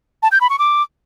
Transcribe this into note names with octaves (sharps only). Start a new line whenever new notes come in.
A5
G6
B5
C#6
D6